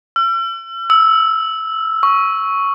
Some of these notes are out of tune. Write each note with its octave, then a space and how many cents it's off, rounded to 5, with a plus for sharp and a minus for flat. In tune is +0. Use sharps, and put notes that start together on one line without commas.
E6 +45
E6 -15
C#6 +5